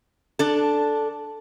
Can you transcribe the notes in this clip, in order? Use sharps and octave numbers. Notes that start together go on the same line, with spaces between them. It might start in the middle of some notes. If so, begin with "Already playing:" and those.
D4 A4